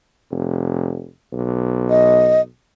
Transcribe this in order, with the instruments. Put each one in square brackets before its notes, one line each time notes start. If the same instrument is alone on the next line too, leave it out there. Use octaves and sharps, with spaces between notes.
[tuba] F1
B1
[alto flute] D#5